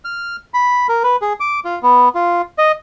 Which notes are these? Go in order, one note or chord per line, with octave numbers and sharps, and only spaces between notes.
F6
B5
A#4
B4
G#4
D6
F4
B3
F4
D#5